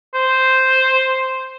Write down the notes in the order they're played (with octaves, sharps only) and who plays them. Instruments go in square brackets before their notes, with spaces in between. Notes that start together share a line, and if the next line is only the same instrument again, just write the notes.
[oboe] C5